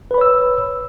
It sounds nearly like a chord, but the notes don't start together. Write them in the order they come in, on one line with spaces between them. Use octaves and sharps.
B4 B5 C#5 E6